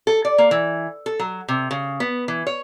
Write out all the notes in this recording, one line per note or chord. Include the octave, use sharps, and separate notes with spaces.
A4
D5
A#3
E3
A4
F#3
C3
C#3
B3
E3
C#5